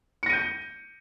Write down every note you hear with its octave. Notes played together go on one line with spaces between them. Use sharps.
G6 A#6 C#7 D#7